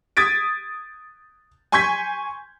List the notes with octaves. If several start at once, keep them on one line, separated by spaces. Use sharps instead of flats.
D#6 G#6 A6 B6 D7
G#5 C6 C#6 G6 G#6 B6